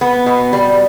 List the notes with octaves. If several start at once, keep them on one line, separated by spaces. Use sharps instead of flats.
B3
B2
G3